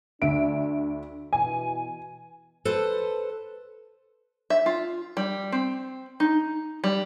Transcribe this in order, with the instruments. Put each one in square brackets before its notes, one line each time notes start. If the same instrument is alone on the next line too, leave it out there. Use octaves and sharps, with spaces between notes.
[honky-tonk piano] D2 E5 D7 [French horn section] D4
[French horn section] B2 E3 [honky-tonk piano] G#5
[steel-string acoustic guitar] A4 B4 C5
[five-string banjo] E5
F4
G3
C4
D#4
G3